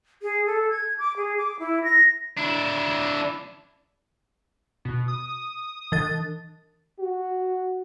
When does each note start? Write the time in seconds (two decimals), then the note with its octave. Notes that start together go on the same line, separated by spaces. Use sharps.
0.22 G#4
0.46 A4
0.70 G#6
0.98 D6
1.17 G#4
1.38 D6
1.59 E4
1.84 A#6
2.37 D4 E4
4.85 B2
5.08 D#6
5.92 E3 A6
7.00 F#4